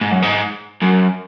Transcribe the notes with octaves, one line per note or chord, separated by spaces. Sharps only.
G#2
F#2
G#2
F#2